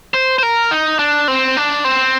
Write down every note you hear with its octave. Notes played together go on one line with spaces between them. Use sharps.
C5
C5
A#4
D#4
D4
C4
D4
C4